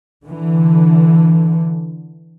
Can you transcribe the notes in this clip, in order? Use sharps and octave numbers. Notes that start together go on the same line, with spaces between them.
D3 E3